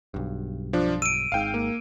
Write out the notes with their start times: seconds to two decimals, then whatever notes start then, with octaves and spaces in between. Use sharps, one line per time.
0.14 B1 G2
0.73 F3 D4
1.02 E6 D7 D#7
1.32 G#1 G#2 F5 G5
1.54 A#3